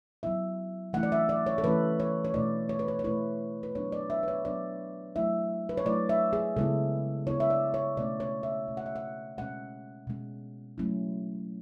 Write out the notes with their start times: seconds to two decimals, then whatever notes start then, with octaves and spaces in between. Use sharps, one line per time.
0.23 F#3 B3 E4 E5
0.93 E3 A3 C#4 E4 F#5
1.03 D5
1.12 E5
1.29 D5
1.47 C#5
1.58 A4
1.64 E3 A3 C#4 E4 B4
2.00 C#5
2.25 C#5
2.34 B2 A3 E4 D5
2.69 C#5
2.79 B4
2.88 C#5
2.99 C#5
3.04 B2 A3 E4 B4
3.63 B4
3.75 F#3 B3 D4 C#5
3.92 D5
4.10 E5
4.23 B4
4.28 C#5
4.45 F#3 B3 D4 D5
5.16 F#3 A3 E4 E5
5.69 B4
5.77 C#5
5.86 F#3 A3 E4 D5
6.09 E5
6.33 G#4
6.56 C#3 G#3 B3 E4 A4
7.27 C#3 G#3 B3 E4 C#5
7.40 E5
7.50 D5
7.74 C#5
7.97 B2 A3 C#4 D5
8.20 C#5
8.43 E5
8.68 B2 A3 C#4
8.77 F#5
8.86 E5
8.96 F#5
9.38 B2 G#3 C#4 F#5
10.07 B2 G#3 C#4
10.78 F#3 A3 C#4 E4